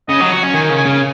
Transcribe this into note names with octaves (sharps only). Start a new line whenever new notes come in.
C#3 D#5
F#3
F#4
C#4
D#3 G#5
C#3
G#5
C#3